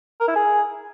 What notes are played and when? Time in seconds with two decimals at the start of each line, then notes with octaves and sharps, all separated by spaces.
0.20 A#4
0.28 E4
0.36 G#4